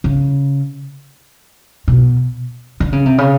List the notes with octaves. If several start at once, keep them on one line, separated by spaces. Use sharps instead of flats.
C#3
B2
D3
C#3
C3
C#3